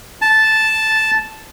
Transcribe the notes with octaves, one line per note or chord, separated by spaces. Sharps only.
A5